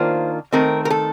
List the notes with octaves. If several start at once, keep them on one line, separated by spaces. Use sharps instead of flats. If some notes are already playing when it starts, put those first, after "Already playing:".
Already playing: D#3 A#3 D4 F4 C5
D#3 A3 C4 A#4
A#4
A4